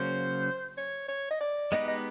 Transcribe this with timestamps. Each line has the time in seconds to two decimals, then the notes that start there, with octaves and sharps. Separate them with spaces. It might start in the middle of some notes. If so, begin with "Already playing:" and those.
Already playing: C#3 F#3 A#3 C#4 C5
0.78 C#5
1.08 C#5
1.31 D#5
1.41 D5
1.72 G#3 B3 D#4 G4 B4 D#5
1.88 D#5